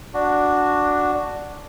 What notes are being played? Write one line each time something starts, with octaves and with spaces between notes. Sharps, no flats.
D4 F#4